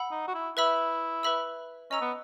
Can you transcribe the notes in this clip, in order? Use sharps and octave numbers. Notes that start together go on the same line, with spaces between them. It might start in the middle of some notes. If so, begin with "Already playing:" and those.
Already playing: F#5 B5 E6
D#4
F#4
E4
E4 B4 E5 B5 E6
B4 E5 B5 E6
C#4 D#5 A#5 E6
B3